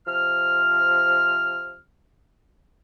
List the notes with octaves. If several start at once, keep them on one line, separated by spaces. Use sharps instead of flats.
C3 F3 F6